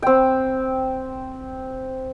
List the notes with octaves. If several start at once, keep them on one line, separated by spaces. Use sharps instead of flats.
C4 G5